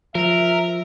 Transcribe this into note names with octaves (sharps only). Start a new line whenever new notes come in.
F3 A#4 E5